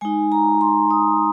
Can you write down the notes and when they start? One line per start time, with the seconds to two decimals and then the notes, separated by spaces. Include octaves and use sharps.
0.01 G#3 D#4 G#5
0.32 A#5
0.61 C6
0.91 D#6